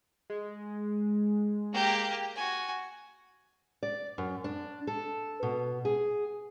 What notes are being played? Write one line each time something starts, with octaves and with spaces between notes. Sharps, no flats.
G#3
A#3 G4
F#4 G#5
D5
F#2
D4
A4
B2
G#4